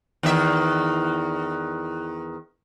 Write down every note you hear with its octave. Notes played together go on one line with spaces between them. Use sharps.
E2 D#3 E5